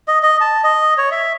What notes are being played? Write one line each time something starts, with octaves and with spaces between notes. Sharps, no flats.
D#5
D#5
A5
D#5
C#5
E5